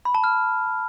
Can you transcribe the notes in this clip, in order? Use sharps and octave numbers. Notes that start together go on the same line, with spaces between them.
B5
A5
F6